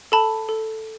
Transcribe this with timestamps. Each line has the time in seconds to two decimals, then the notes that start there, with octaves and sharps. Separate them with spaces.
0.12 A4 A5 B5
0.49 A4